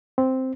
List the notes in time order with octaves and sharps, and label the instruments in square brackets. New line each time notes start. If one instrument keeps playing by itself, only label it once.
[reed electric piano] C4